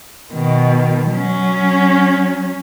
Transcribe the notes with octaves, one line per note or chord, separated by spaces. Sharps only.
B2 D#3
F#3 C#4